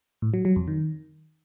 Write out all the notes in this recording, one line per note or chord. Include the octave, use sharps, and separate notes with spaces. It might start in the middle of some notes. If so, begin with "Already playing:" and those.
A2
F#3
F#3
F2
D#3